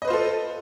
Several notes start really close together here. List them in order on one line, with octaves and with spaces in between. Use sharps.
D#5 B4 C5 F4 A4